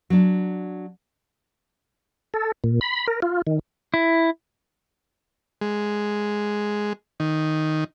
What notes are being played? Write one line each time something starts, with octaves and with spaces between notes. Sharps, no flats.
F#3 D4
A4
A#2
B5
A#4
F4
D#3
E4
G#3
D#3